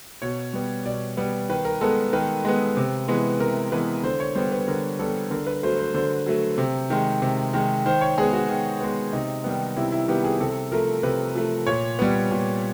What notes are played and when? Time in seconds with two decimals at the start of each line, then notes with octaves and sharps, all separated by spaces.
0.22 B2 C#5
0.53 G3 B3
0.86 B2 D5
1.17 G3 B3
1.49 D#3 B4
1.65 A#4
1.81 G#3 B3 A4
2.13 D#3 B4
2.45 G#3 B3
2.77 C3
3.08 E3 G#3 B3
3.40 C3 A#4
3.72 E3 G#3 B3 B4
4.03 D3 C5
4.20 C#5
4.35 G3 B3 C5
4.52 B4
4.68 D3 A#4
4.99 G3 B3 A4
5.31 D3 A#4
5.47 B4
5.63 F#3 A3 C5
5.79 C5
5.94 D3 C5
6.26 F#3 A3
6.58 C3
6.90 D#3 G#3
7.22 C3
7.54 D#3 G#3
7.86 D#3 C5
8.01 C#5
8.17 G#3 B3 G#4
8.33 F#4
8.49 D#3
8.81 G#3 B3
9.13 C3 D#4
9.44 D#3 G3 B3
9.77 C3 E4
9.92 E4
10.08 D#3 G3 B3 G4
10.24 G#4
10.40 C3 A4
10.72 F3 A3 A#4
11.03 C3 B4
11.35 F3 A3
11.67 A#2 C#5
11.99 G3 B3
12.31 A#2